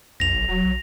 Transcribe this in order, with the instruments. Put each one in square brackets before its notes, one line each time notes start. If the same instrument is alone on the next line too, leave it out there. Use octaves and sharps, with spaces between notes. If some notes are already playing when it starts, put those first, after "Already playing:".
[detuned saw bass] B1 [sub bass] F2 [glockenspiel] A#6 F7
[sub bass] G#1
[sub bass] E1 [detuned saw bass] F#3
[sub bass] B1